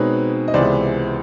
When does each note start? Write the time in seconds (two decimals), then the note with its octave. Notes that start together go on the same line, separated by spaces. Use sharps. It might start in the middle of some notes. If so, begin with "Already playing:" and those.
Already playing: B2 G#3 C4 D#4 B4 C#5
0.48 D#5
0.54 C#2 C3 E3 G#3 B3 C5 D5